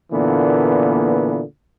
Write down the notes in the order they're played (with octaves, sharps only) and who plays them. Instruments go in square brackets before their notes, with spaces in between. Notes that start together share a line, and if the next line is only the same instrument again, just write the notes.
[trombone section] A#2 D3 E3 A#3 B3